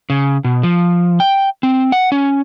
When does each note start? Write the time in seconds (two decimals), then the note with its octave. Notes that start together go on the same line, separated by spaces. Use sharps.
0.10 C#3
0.44 B2
0.63 F3
1.20 G5
1.63 C4
1.92 F#5
2.12 C#4